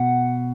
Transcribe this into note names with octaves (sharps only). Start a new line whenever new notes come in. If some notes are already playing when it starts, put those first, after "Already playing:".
Already playing: B2 F#5